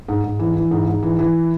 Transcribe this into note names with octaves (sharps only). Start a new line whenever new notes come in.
G#2
G#2
E3
E3
G#2
G#2
E3
E3